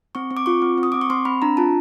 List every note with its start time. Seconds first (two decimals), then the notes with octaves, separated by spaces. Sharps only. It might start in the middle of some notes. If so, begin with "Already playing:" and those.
0.15 C4 C#6
0.31 C4
0.37 D6
0.46 F4 C#6
0.62 C4
0.78 C4
0.83 D#6
0.92 C4 D6
1.01 C#6
1.10 C4 C6
1.25 C4 B5
1.42 D4 A#5
1.57 F4 A5